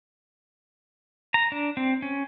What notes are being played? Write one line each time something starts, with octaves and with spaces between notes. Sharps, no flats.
A#5
D4
C4
C#4